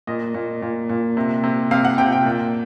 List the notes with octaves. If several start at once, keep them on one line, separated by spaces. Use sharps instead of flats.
A#2 D#5
A#2
A#2
A#2
C3
C3
C3 F5
F#5
C3 G5
G5
A#2